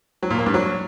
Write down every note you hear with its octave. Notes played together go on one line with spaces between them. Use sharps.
F#3
A#2
A#3
G2
F#3